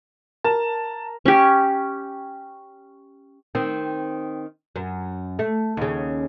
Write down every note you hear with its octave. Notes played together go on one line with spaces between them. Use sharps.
A#4 A5
C#4 G4
D#3 C4
F#2
A3
D#2 C#3